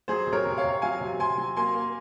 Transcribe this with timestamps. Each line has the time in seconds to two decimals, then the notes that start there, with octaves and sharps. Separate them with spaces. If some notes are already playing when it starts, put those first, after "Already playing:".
0.08 F#3 G#4 C5
0.27 C3
0.33 A#4 C#5
0.46 C3
0.58 C#5 F5
0.64 C3
0.82 F#3 F5 G#5
1.01 C3
1.19 C3 G#5 C6
1.38 F#3
1.57 A#3 G#5 C6
1.75 A#3